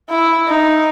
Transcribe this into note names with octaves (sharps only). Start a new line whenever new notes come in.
E4
D#4